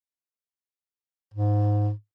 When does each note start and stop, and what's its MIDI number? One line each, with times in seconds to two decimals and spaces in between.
1.34 1.91 44